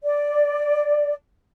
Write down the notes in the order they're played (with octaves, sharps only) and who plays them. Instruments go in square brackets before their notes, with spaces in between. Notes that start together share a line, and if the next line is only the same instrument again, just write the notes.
[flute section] D5